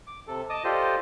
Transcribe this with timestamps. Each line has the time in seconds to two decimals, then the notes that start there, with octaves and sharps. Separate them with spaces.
0.07 D6
0.27 C3 A4
0.50 D#5 A5 D6 D#6
0.64 F4 G4 A4 C5 D5 D#5